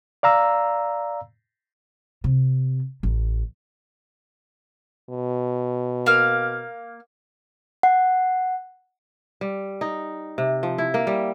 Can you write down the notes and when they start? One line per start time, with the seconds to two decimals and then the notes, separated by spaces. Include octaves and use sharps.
0.23 D5 F5 A#5 E6
2.24 C3
3.03 A1
5.10 B2
6.06 A#3 F5 F6
7.83 F#5
9.41 G3
9.81 D#4
10.38 C3
10.63 F3
10.78 E4
10.94 A#3
11.07 G3